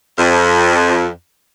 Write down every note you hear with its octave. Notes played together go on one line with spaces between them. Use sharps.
F2